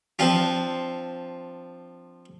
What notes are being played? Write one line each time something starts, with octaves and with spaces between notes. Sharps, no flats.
F3 C4 D4 F4